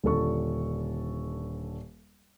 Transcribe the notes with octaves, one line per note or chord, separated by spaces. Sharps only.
D#1 D3 A4 C#6